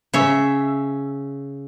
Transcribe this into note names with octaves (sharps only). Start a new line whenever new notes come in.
C#3 C#5 E5